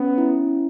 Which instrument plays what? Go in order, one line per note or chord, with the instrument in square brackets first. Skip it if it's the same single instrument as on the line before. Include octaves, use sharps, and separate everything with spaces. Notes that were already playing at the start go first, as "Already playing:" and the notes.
Already playing: [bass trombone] B3 [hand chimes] C#4
[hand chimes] E4